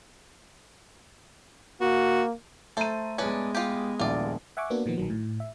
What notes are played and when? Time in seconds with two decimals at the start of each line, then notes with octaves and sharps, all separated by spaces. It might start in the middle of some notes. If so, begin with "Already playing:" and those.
1.81 A#3 F#4
2.77 A3 A4 C5 A#5 D#7
3.18 G#3 B3 C#4 D4 B4
3.55 F4 G4
4.00 D#1 A#1 E4 F4 D5
4.57 E5 F#5 G#5 C#6 D6
4.70 A#3 B3 D4 F#4
4.86 A#2 D#3 F3 B3
4.97 A#1 D#3 F#3
5.10 A2
5.40 E5